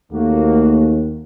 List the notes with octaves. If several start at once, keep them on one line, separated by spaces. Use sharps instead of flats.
D#2 A3 A#3 F#4